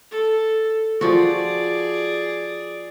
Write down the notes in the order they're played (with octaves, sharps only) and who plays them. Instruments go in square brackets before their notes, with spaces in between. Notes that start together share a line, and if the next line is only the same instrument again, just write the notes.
[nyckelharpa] A4
[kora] F3 F#4 [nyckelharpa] G#4 D5